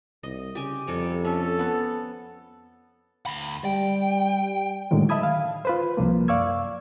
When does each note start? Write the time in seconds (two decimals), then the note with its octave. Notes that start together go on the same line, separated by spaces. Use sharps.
0.23 C2 D#5
0.55 C#3 G4 G#5
0.87 F2 C3 G3 A4
1.25 C#4 A4 E5
1.59 B3
3.26 D2 B5
3.65 G3 G5
4.91 A2 D3 D#3 F#3 G#3
5.09 D#5 E5 A5 B5 D#6 G#6
5.23 F5
5.65 F4 B4 C5
5.97 C2 F3 A#3
6.28 F#2 D5 F5 C#6 E6 G#6